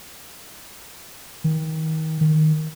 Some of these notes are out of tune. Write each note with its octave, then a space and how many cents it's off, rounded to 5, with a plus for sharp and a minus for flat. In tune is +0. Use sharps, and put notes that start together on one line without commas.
D#3 +30
D#3 -5